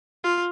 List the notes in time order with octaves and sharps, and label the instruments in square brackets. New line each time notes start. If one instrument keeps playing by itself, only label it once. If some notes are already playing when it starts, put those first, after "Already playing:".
[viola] F4